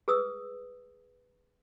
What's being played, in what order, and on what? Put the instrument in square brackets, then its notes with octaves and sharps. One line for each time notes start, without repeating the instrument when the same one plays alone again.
[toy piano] G#4 B4 D#6 E6